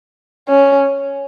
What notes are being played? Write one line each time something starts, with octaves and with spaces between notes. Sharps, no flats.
C#4